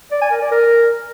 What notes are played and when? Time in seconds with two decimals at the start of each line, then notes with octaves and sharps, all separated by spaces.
0.12 D5
0.22 G#5
0.32 A#4
0.42 D5
0.52 A#4